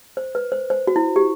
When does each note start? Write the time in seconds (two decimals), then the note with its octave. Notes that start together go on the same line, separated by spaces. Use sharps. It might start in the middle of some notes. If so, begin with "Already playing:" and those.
0.17 C5
0.35 B4
0.52 C5
0.70 C5
0.87 F#4
0.96 E4
1.16 G4